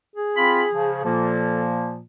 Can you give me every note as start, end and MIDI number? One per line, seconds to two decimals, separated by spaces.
0.16 1.02 68
0.37 0.64 60
0.37 0.64 65
0.37 0.64 83
0.73 1.02 49
0.73 1.02 53
1.05 2.00 46
1.05 2.00 53
1.05 2.00 58
1.05 1.67 69